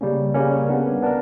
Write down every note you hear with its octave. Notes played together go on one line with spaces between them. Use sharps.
C#3 G3 A#3 C#4
C#3 G3 A#3 C#4
B3 D4 A#4
B3 D4 A#4